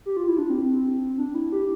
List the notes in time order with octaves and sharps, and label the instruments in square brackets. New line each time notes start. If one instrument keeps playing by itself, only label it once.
[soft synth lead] G4
F4
E4
D4
C4
D4
E4
G4